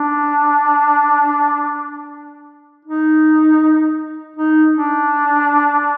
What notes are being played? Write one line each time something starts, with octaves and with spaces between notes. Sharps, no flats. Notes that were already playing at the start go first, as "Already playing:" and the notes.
Already playing: D4
D#4
D#4
D4